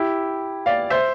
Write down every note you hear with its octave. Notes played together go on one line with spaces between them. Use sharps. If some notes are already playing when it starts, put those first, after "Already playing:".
Already playing: E4 G4
D5 F5
C5 E5